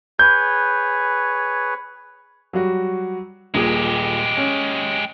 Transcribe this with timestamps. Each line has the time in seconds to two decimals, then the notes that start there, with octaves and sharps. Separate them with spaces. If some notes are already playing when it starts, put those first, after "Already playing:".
0.19 G#4 B4 C#5 G6
2.53 F#3 G3 F#4
3.54 D#1 A#2 G#3 G4 G#4
4.37 C#4